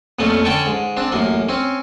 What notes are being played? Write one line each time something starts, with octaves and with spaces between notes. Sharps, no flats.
F2 A#2 F3 A3 C#4
D3 C#4 G5 A5 C#6
G#2
C4 D4
A1 F#2 A#3
C4 C#4